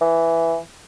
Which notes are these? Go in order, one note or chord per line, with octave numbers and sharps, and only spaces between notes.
E3